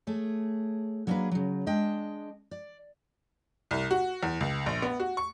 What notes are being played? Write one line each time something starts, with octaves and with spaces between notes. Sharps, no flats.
A3 G#4 C#5
F#3 A#3 D4 F4 G#4 B4
C#3 F#3
G#3 D4 D#5 G5
D5
C2
F#4
E2
C#2
A#1
B3
F#4
C#6